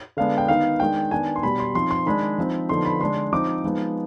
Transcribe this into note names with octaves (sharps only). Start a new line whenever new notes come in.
D3 G#3 B3 D4 F5
G5
D#3 B3 D#4 F5
D#3 G#3 D4 G5
D#3 B3 D4 G#5
C6
B2 G3 D4 B5
C6
F3 C4 D#4 C6
C6
D#3 G#3 D4 B5
F3 C4 D#4
D3 F3 B3 D#4 C6
B5
D3 G#3 D4 C6
F3 C4 D#4 D6
F3 G#3 B3 D#4